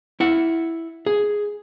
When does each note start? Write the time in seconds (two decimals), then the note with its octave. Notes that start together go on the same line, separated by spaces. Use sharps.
0.20 E4 F#5
1.06 G#4